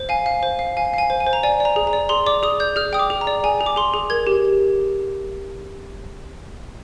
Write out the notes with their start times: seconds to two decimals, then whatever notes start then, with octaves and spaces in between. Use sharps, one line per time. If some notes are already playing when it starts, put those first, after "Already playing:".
Already playing: C5
0.09 F5 G#5
0.26 F5
0.43 C5
0.59 F5
0.77 F5 G#5
0.93 F5 G#5
1.10 C5
1.20 G#5
1.26 C5
1.33 A#5
1.43 D5 G#5
1.60 D5 A#5
1.76 G#4
1.87 A#5
1.93 D5
2.09 G#4 C6
2.26 D5 D6
2.43 G#4 D#6
2.60 D5 G6
2.76 G#4 F6
2.93 G5 D#6
2.99 D6
3.10 G#4
3.21 A#5
3.27 D5
3.44 G#4 G#5
3.61 G#4
3.66 D6
3.76 G#4 C6
3.94 G#4
4.10 A#4 G#6
4.27 G4